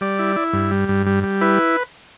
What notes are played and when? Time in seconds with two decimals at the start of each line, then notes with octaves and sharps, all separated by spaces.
0.01 G3 D5
0.19 E4
0.36 E4
0.53 G2
0.71 G3
0.89 G2
1.06 G3
1.24 G3
1.41 E4 B4